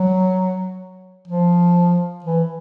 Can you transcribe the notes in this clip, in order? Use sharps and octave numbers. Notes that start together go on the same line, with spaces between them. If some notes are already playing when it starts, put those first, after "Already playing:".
Already playing: F#3
F3
E3